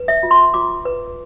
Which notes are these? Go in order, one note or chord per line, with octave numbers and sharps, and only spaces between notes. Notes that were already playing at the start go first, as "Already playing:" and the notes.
Already playing: B4
E5
F4
C6
F4 D6
B4